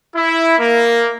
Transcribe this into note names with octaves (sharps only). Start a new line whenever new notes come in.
E4
A#3